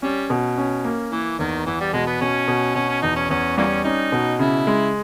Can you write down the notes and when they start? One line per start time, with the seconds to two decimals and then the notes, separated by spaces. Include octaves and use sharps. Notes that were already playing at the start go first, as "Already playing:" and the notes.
0.02 G3 C#4
0.30 B2
0.58 C#4
0.84 A#3
1.12 E3 A#3
1.39 E2 D#3
1.66 E2 E3
1.81 G3
1.93 B2 G#3
2.07 B3
2.21 B2 C#4
2.48 B2
2.75 B2 C#4
2.89 C#4
3.03 E2 D#4
3.16 C#4
3.30 E2 C#4
3.57 E3 G3 A#3 C#4
3.84 C#4 D#4
4.12 B2
4.39 C#3 E4
4.67 G#3